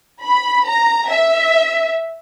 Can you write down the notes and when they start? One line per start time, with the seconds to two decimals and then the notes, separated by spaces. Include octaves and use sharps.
0.21 B5
0.65 A#5
1.09 E5